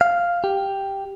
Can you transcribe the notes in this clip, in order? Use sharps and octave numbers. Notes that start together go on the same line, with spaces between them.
F5
G4